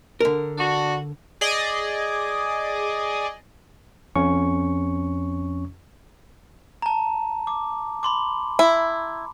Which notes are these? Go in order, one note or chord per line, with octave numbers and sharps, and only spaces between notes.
D3 A#4
D4 F#4
G#4 D5 D#5
F2 C#4 C#6
A5 A#5
D6
B5 C6 D6
E4